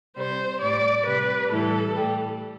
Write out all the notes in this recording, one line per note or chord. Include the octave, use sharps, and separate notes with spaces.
C3 G3 C5
A2 G3 D5
C3 G3 B4
A2 E3 G3 A4
A2 G3